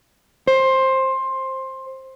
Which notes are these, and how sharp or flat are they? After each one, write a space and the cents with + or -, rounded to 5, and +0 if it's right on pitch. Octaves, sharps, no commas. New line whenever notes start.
C5 +15